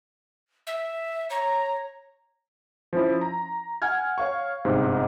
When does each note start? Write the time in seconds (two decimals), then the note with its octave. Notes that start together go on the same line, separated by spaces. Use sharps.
0.67 E5
1.30 C#5 A#5
2.93 F3 C#4 E4
3.21 A#5
3.82 F#5 G#5 F6 G#6
4.18 C#5 F5 C#6
4.65 G1 G#2 C3